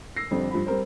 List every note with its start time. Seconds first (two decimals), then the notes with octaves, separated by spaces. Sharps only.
0.16 E6 A#6 C7
0.31 F2 D3 G3 C4 D4
0.51 G2 F3 B5
0.66 G3 C4 A#4 C5